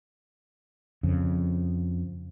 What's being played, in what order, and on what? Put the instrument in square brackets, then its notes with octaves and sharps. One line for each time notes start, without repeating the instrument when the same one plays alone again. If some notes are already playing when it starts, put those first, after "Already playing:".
[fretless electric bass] F2 C#3